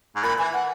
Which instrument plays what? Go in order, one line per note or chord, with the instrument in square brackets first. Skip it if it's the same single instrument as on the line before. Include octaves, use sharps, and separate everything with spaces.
[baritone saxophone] G#2
[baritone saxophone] A#2 [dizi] B5
[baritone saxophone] E3 [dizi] G#5
[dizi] F#5